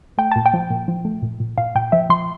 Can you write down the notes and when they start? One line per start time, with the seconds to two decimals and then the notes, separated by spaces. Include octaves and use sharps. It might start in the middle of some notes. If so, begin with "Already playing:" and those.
0.18 A3 G5
0.32 A#2 A5
0.46 G5
0.53 F3
0.70 A#2
0.88 F3
1.05 A3
1.22 A#2
1.40 A#2
1.58 A#2 F5
1.75 A#2 G5
1.92 F3 E5
2.09 F3 C6